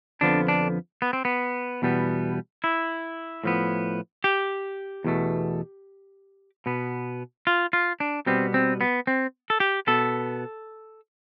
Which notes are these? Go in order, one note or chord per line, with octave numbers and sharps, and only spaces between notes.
F2 D3 F3 B3 D4
D4
B3
C4
B3
E2 B2 G3 B3
E4
A2 F3 B3
G4
E2 B2 A3
B2 B3
F4
F4
D4
B2 G3 B3 C4
C4
B3
C4
A4
G4
B2 B3 A4